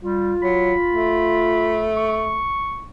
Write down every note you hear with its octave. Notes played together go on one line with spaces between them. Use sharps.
G3 F4
F#3 B5
A3
C#6